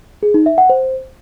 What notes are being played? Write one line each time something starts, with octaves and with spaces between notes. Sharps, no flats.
G#4
D#4
E5
F#5
C5